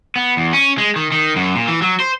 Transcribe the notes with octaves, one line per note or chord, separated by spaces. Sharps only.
B3
E2
C#4
G#3
D#3
D#3
F#2
A#2
E3
F#3
C5